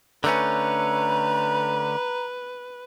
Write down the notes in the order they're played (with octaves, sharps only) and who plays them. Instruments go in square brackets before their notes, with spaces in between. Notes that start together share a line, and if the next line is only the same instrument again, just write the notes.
[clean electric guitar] D3 A3 C#4 [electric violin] B4 [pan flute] A#5